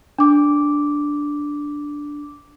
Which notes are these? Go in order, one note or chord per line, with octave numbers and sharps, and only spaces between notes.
D4 D6